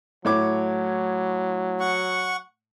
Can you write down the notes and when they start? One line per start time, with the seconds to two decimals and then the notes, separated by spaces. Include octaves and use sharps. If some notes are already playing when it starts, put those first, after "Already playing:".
0.25 A2 F#3 C#5 D6
1.80 F#5 C#6